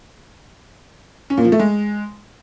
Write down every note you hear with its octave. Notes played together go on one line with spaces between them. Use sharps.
C#4
A#2
F3
A3
G#3